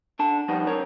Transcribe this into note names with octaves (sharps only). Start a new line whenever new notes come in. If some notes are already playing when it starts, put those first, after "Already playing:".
D4 A4 A5
F3 G3 B3 D#4
C#2 F#2 A#4 C#5